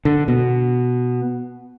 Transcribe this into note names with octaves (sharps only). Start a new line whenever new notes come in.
D3
B2